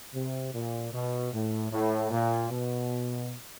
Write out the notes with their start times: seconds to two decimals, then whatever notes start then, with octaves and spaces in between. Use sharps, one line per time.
0.14 C3
0.53 A#2
0.93 B2
1.33 A2
1.72 A2
2.11 A#2
2.50 B2